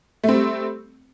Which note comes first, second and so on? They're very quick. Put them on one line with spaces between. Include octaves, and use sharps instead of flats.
A3 C4 G3